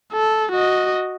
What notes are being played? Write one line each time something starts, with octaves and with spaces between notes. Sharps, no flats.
A4
F#4 D#5